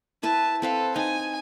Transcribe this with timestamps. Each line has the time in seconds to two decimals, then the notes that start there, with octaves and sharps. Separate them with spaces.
0.23 E4 B4 E5 A5
0.62 C4 A4 B4 F5
0.96 D#4 G#5